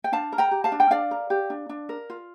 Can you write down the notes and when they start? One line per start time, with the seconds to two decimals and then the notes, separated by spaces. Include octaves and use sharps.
0.04 G5
0.12 D4 F5 A5
0.32 A#4
0.38 G5 A#5
0.51 G4
0.64 F5 A5
0.72 D4
0.80 G5
0.90 D4 D5 F5
1.11 A#4
1.30 G4
1.50 D4
1.69 D4
1.89 A#4
2.10 F4